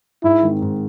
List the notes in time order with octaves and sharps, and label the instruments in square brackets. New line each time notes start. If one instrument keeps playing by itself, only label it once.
[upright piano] G#2 [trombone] E4
[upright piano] D#3 G#3 C4
G#2